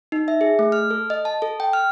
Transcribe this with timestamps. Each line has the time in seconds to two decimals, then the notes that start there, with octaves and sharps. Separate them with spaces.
0.12 D#4
0.28 E5
0.41 G#4
0.59 A3
0.72 F6
0.91 A4
1.10 D#5
1.25 A5
1.42 A4
1.60 G5
1.73 F6